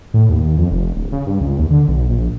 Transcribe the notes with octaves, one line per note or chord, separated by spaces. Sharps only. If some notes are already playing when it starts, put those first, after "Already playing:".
A2
D#2
F2
F1
D1
C#3
G2
C#2
D#2
D3
B1
A#1